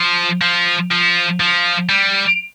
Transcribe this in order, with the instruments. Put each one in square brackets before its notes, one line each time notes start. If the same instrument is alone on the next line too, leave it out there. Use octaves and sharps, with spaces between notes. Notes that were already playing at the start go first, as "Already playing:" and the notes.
Already playing: [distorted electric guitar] F3
F3
F3
F3
G3